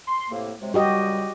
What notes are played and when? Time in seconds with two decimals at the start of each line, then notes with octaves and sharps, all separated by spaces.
0.07 C6
0.30 A2 C3 A#3
0.61 C3 F#3 G#3
0.74 C#2 G3 F#4 G4 D#5